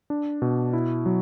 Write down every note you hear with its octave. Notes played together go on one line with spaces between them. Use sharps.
D4
B2
E4
F#3